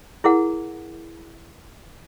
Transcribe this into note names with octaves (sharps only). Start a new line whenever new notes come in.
E4 G#4 A#4 F#5